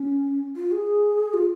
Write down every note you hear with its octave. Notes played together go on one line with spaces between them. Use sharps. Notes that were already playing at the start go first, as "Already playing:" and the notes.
Already playing: C#4
F4
G#4
F4